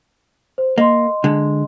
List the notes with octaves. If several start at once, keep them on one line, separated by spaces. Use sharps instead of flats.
C5
A#3 D#5 C6
D3 G#3